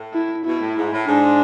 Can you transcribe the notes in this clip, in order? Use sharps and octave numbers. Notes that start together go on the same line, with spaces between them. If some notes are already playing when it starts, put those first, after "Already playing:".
Already playing: A2
E4
B2 E4
A2
G#2
A2
G#2 D4